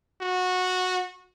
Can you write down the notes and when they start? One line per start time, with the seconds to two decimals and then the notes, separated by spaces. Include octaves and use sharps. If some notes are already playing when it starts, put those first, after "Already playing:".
0.22 F#4